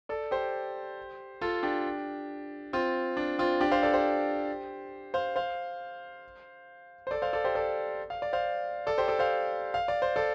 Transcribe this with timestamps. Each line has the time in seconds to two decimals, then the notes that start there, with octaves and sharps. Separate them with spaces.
0.09 A4 D5
0.31 G4 C5
1.41 F4 A4
1.63 D4 G4
2.73 C4 F4
3.17 D4
3.39 C4 F4
3.60 D4 G4
3.71 C5 F5
3.83 A4 D5
3.93 G4 C5
5.14 C5 F5
5.36 C5 F5
7.07 C5
7.11 A4 D5
7.22 C5 F5
7.33 A4 D5
7.44 G4 C5
7.55 A4 D5
8.10 F5
8.22 D5
8.33 C5 F5
8.87 A4 D5
8.98 G4 C5
9.08 A4 D5
9.19 C5 F5
9.74 F5
9.88 D5
10.02 C5
10.16 A4 D5